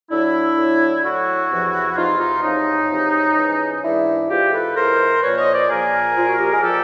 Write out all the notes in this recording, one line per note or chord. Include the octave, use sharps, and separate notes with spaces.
A2 F#3 D4 E4
A2 F#3
A2 F#3 E4 F#4
E2 C3 F3
E2 C3 F3 D#4 F4
D#4 F4
E2 C3 F3 C#4 D#4
E2 C3 F3
G#2 E3
G#2 E3 D4 E4
G#2 E3 F4 G4
A4 B4
G#2 E3 A#4 C5
A#2 F3 B4 C#5
C#5 D#5
C5 D5
A#2 F3 G#4 A#4
A#2 F3 F4
F#4
G4
G#4
A#2 F3 G4 A4